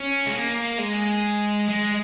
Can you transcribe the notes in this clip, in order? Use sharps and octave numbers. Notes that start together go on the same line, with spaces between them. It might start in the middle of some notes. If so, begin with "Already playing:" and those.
Already playing: C#4
G#3
A#3
G#3
G#3